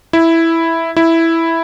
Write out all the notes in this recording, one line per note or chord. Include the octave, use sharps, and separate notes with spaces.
E4
E4